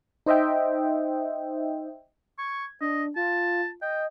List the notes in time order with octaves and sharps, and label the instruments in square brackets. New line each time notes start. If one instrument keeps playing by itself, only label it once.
[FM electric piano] D#4 C5 D#5 E5 G5
[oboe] C#6 [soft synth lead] G#6
[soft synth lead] D4 [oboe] D#5
[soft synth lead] F4 [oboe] A5
[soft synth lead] D#5 [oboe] G5